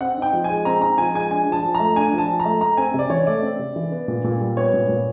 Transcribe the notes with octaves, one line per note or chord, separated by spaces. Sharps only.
C4 F#5
D#4 G5
F3
G#5
G#3
C4 A#5
D#4 A#5
F3 G#5
G#3 G#5
D4 G#5
F3 A5
F3
A#5
A3
D4 G#5
F3
A5
F3
A#5
A3
A3 A#5
C4 G#5
C3 D5
E3 C#5
A3 D5
C4
C3
E3
B3
A#2
A#2
G3
B3 C#5
A#2
A#2